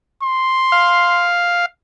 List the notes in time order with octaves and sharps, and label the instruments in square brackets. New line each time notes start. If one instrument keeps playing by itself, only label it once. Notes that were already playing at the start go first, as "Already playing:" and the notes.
[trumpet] C6
[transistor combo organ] F5